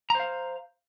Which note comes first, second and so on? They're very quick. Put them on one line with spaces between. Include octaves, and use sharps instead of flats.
A#5 C5 F5